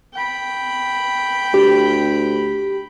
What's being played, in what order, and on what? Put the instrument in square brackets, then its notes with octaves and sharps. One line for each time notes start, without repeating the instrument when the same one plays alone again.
[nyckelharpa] G5 B5
[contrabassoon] D2 [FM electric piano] G4